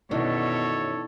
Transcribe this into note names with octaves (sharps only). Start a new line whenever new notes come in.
F#2 B2 D#3 F#3 E4 A4 C#5 D5